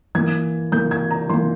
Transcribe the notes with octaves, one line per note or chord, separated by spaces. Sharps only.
E3 A#3 G#6
E3 A#3 G6
G#6
A#5
E3 A#3 C6